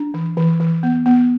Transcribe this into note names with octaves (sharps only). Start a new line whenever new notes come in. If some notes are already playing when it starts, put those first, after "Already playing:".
Already playing: D4
E3
E3
E3
B3
B3